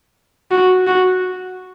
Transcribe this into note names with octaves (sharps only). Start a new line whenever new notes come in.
F#4
F#4